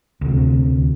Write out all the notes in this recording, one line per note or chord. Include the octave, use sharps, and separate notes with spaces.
D2 C3